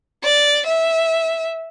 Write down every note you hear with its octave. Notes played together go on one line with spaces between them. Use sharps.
D5
E5